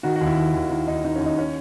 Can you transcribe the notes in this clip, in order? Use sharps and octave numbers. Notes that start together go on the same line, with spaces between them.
D#3 F#4
F#4
D#2
E4
D#3
D#2
D#3 E4
D#2 D#4
D#3 D#4
C#4
D#2
D#4
C#4